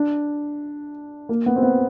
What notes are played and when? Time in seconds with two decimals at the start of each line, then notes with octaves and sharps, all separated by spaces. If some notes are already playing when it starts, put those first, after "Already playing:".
Already playing: D4
1.29 A#3
1.46 B3
1.56 C4
1.63 B3